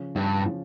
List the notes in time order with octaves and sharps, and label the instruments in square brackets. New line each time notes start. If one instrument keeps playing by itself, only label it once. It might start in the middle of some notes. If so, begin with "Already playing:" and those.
Already playing: [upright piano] C#3 F3
[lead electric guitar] G2
[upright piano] C#3 F3